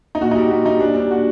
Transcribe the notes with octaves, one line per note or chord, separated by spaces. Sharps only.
D#4
A#2 F#4
G3 D#4
G4
A#2 F#4
G3 D#4
A#2 D4
G3 D4
A#2 F#4